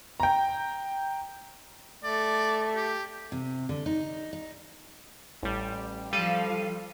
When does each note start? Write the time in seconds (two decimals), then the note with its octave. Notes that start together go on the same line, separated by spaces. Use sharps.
0.20 G5 A#5
2.04 A3 D5
2.75 G4
3.32 C3
3.69 D3
3.86 D#4
4.33 D#4
5.43 A1 G3
6.13 F3 G3 A4 F5 D#7